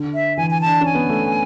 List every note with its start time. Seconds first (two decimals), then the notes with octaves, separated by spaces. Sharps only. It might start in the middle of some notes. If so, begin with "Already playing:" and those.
Already playing: D3
0.14 E5
0.37 E3 G#5
0.50 G#5
0.61 A5
0.66 D4
0.81 C#4 G#5
0.95 B3
1.09 A3